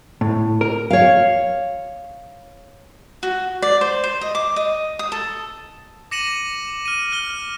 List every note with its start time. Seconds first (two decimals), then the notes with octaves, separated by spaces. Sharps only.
0.21 A2
0.61 A#4
0.90 C#5 F5
3.23 F#4
3.62 D5
3.81 C5
4.04 C5
4.21 D#5
4.35 D6
4.56 D#5
4.99 D#6
5.12 A4
6.11 D6 A#6 C#7 D#7 E7 F#7
6.85 F6 D#7
7.12 F6 G7